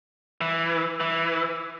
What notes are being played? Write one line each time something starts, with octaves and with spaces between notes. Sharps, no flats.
E3
E3